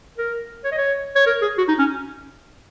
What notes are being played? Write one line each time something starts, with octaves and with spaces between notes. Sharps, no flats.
A#4
C#5
D#5
C#5
C#5
A#4
G#4
F#4
D#4
C#4